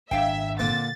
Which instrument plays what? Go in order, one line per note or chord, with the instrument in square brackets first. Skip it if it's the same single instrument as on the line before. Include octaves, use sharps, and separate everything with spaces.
[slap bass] G#1 D4 [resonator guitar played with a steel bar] A#2 F5 G5 [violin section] E5
[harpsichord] A#2 D3 [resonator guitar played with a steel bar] C4 [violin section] A6